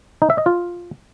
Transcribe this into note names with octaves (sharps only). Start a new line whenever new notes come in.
D#4
E5
D#5
F4